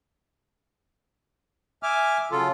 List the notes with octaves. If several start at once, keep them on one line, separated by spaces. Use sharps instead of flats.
E5 G#5 D6 F6
C#3 F#3 F4 A4